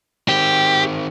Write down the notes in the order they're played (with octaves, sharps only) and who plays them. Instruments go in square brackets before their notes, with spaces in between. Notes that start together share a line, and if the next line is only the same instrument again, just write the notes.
[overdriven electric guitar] D#3 C4 [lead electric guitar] G4